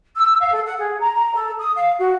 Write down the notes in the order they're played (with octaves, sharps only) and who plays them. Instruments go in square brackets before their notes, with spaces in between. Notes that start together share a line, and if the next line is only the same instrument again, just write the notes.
[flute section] E6
F5
A4
F#5
G#4
A#5
A#5
A4
D#6
F5
F#4